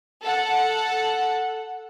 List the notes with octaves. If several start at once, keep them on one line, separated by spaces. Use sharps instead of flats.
A4 F#5